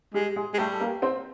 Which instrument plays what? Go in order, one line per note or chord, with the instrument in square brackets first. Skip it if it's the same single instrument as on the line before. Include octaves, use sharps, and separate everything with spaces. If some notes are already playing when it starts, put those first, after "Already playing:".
[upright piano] G3 G4 [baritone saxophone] G#3
[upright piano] G#3 G#4
[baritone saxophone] G#3
[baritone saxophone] G3 [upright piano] A3 A4
[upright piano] A4
A#3 A#4
C4 C5